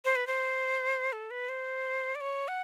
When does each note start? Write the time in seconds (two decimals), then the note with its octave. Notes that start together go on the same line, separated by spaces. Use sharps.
0.05 C5
0.16 B4
0.27 C5
1.12 A4
1.31 B4
1.49 C5
2.15 D5
2.21 C#5
2.48 F#5